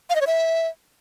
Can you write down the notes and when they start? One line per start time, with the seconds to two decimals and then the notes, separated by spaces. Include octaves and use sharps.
0.10 F5
0.15 D#5
0.21 C#5
0.27 E5